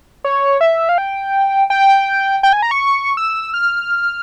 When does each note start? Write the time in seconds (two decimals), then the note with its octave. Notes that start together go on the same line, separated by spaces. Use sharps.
0.24 C#5
0.61 E5
0.89 F5
0.98 G5
1.70 G5
2.43 G5
2.53 G#5
2.62 A#5
2.71 C#6
3.17 E6
3.54 F6